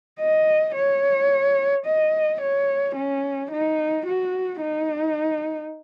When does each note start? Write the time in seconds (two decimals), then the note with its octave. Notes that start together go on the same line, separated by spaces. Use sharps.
0.20 D#5
0.75 C#5
1.86 D#5
2.42 C#5
2.96 C#4
3.51 D#4
4.06 F#4
4.61 D#4